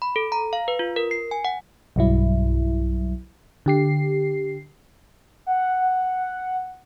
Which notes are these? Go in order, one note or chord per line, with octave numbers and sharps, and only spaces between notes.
B5
A4
A#5
F5
B4
F4
A#4
C7
G#5
F#5
B1 G2 F#3 E4
D3 G4 C7
F#5